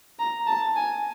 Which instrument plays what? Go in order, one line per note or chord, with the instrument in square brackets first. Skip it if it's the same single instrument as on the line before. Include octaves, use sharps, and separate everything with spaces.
[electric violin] A#5
A5
G#5